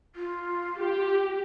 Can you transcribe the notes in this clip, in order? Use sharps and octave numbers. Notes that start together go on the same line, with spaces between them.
F4
G4